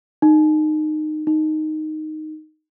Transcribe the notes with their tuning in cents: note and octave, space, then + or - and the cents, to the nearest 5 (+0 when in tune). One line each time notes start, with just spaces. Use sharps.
D#4 -20
D#4 -5